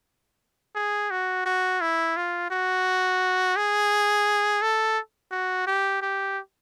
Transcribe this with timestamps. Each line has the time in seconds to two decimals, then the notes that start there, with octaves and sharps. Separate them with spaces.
0.75 G#4
1.11 F#4
1.46 F#4
1.81 E4
2.17 F4
2.51 F#4
3.56 G#4
4.62 A4
5.32 F#4
5.67 G4
6.02 G4